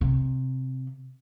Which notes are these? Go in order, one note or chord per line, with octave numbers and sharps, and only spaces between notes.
C3